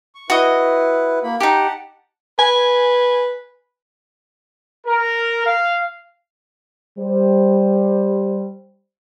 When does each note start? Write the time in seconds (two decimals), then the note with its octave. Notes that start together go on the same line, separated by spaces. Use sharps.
0.15 C#6
0.30 E4 F#4 B4 D#5
1.23 A#3 B5
1.40 D#4 G4 F#5 A5
2.39 B4 G#5
4.86 A#4
5.46 F5
6.98 G3 C5